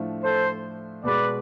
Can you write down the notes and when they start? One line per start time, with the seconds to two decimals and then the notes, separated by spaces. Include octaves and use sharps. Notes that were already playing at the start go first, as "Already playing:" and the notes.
Already playing: A2 F3 A3 D4 F4
0.23 A4 C5
1.04 B2 G#3 B3 B4 D5